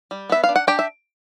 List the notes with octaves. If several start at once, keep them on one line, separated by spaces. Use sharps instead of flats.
G3
B3 E5
F5
D4
F#5
D4 G4 G5
E5